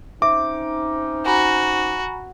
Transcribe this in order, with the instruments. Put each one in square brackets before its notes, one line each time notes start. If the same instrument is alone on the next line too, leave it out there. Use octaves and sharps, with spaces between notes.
[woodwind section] C4 C#4 D#4 [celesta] E5 [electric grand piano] D6
[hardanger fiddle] F#4 [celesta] G#5 A#5 B5